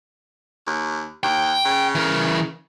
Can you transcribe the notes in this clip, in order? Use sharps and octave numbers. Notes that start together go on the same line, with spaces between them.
D#2
D#2 G5
C#3
E3 A#4